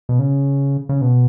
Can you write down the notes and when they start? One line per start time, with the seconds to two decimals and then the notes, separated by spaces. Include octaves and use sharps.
0.09 B2
0.19 C#3
0.89 C#3
1.01 B2